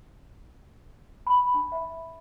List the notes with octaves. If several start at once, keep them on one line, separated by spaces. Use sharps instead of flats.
B5
D4
E5